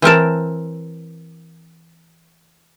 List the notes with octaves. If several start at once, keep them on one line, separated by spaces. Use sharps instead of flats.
E3 C4 A#4 A5